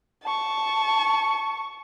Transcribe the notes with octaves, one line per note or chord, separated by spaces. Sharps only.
A5 C#6